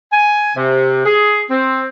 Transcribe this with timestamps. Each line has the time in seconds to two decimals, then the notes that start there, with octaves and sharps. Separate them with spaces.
0.12 G#5
0.56 C3
1.05 G#4
1.49 C4